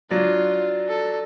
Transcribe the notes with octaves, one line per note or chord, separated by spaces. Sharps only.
F#3 D4 F4
A4